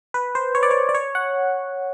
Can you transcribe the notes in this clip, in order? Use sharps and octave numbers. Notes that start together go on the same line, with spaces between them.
B4
C5
C#5
D5
C#5
D5
C#5
F#5